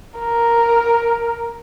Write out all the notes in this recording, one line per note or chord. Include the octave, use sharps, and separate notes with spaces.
A#4